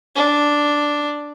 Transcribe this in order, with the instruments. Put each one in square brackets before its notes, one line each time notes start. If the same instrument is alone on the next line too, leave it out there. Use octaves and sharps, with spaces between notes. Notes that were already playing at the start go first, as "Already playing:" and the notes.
[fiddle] D4